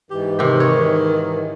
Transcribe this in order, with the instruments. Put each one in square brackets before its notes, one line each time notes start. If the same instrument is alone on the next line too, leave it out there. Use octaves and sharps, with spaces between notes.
[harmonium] G#2 E3 [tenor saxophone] G4
[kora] C3 G4 [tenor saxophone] D#3
[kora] C#5